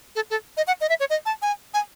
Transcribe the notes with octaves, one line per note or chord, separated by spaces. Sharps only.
A4
A4
D#5
F#5
D#5
E5
C#5
D#5
A5
G#5
G#5